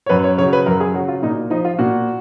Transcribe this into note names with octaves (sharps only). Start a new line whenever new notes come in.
C#5
F#2 B4
C#5
C#3 F#3 C#5
B4
F#2 A#4
G#4
C#3 F#3 F#4
F4
A#2 D#4
F3 D#4
F4
A#2 F#4